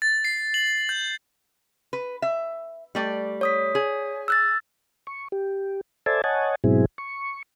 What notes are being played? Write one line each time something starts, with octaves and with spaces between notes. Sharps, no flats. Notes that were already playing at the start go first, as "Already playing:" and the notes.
A6
C7
F#7
G6
B4
E5
G3 A3 D5
C#5 D#6 B6
G#4
E6 F#6 A6
C#6
G4
A4 C5 D5 E5 G#5 A5
C#5 D#5 F#5 G#5 A5
G#2 B2 F#3 C4 E4 G#4
C#6